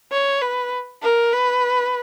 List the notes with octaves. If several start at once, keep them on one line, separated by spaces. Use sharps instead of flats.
C#5
B4
A#4
B4